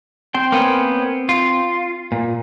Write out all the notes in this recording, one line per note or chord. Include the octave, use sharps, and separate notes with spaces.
C4 C5 G5
A#3 B3 C#4
F4
A#2